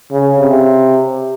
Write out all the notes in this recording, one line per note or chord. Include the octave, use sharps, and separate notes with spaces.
C#3
C3